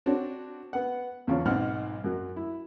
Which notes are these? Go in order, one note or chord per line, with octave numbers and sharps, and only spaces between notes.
C4 D4 F#4 C#5
B3 F#5
E2 C#3 F3 C#5
B1 G#2 C4 F#5 F6
F#2 F#3
E4